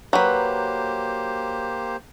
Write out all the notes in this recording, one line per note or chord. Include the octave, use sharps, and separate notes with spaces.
F#3 A#3 G4 B4 C5